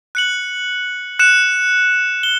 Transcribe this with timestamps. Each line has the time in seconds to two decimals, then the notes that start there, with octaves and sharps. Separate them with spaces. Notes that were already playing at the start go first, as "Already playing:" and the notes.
0.15 F#6 C#7 F#7
1.19 F#6 C#7 E7
2.23 G7